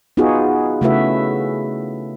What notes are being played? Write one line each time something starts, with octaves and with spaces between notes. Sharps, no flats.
B3 D#4 F4 F#4 G#4
C#3 A3 E4 F#4 B4 E5